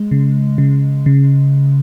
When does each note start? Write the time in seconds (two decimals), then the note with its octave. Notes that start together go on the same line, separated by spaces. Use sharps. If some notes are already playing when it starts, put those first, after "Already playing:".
Already playing: G#3
0.11 C#3
0.58 C#3
1.06 C#3